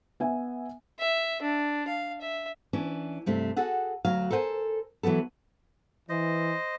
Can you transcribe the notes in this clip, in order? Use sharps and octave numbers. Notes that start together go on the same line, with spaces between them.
B3 E5 G#5
E5
D4
F5
E5
E3 C#4 D4
G2 C3 A3 D4
F#4 G#4 A4 F#5
D2 F#3 F5
A4 A#4 C5 F#5 G#5
E3 F#3 A3 B3 A4
E3 C5 D#5